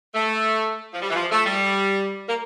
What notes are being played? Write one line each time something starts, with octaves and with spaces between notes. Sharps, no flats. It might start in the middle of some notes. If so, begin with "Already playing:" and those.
A3
F3
G3
E3
F3
A3
G3
A#3